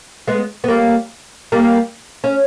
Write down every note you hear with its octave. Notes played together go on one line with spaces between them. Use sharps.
G#3 B3
B3
G3 A#3
G3 A#3
C#4